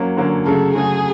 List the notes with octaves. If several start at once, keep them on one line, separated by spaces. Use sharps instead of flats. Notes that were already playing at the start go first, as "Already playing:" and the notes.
Already playing: F#3 A#3 C#4
D3 F#3 A#3 C#4
C#3 F#3 A3 A4
C#3 F#3 A3 G#4